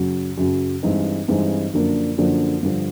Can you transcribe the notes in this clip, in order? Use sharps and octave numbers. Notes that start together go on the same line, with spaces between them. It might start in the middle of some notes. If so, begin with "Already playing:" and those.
Already playing: F#2 C#3 F#3
F#2 C#3 F#3
G2 E3 G#3 C4 D#4
G2 E3 G#3 C4 D#4
F#2 D3 F3 A#3 D4
F#2 D3 F3 A#3 D4
G2 D3 F3